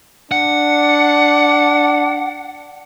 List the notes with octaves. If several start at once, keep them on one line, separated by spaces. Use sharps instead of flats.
D4 F#5